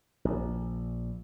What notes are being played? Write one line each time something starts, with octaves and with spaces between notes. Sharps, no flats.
A#1